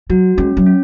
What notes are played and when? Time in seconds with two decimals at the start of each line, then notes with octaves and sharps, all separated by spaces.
0.10 F#3 F#4
0.38 G#3 C#4
0.57 F#3
0.66 C#4